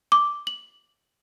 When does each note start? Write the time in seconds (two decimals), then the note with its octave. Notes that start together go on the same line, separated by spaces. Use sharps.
0.12 D6
0.47 F#7